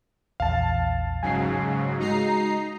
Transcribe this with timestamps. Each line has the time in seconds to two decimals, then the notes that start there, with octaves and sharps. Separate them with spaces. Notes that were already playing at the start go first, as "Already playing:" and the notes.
0.40 A#1 E2 F5 A5
1.23 G#2 C#3 F#3 G#5 C7
2.00 G#3 D#4 F#4 A#5 C7